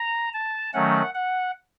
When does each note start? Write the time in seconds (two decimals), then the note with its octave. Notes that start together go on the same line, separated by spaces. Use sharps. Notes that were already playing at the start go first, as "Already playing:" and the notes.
Already playing: A#5
0.33 A5
0.73 D#3 F#3 A3 C#4 F#5
1.14 F#5